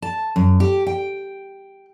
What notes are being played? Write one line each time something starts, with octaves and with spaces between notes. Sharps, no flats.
A5
F#2
G4
G5